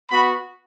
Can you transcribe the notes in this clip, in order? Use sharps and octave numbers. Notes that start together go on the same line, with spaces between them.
B3 F#4 B5